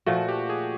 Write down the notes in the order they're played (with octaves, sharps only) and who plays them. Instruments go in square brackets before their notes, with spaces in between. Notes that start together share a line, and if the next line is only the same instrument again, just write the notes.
[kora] A#2 F3 A3 [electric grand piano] F#4
[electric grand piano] G4
G#4